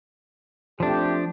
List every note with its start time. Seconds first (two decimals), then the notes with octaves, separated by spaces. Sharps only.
0.80 F3 A3 C4 D4 G4